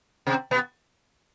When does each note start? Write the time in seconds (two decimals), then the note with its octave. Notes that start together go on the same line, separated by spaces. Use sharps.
0.27 C3 C4
0.51 B2 B3